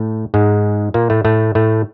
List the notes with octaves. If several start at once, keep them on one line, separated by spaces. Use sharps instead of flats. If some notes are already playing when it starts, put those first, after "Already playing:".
Already playing: A2 A3
G#2 G#3
A#2 A#3
A2 A3
A2 A3
A2 A3